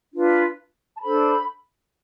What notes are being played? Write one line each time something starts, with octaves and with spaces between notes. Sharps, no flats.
D4 F4 B4
A5
D4 A4 C5 B5